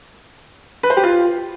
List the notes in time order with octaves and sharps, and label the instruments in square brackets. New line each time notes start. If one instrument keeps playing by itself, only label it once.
[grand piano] B4
C5
G4
F4